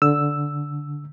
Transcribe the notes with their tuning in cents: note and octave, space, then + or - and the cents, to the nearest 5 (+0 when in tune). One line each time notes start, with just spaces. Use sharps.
D3 -10 E6 +0